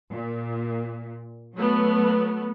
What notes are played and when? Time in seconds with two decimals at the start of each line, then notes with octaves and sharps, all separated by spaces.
0.12 A#2
1.55 F#3 A3 B3